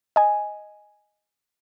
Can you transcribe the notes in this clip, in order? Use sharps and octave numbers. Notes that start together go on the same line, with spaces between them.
D#5 G#5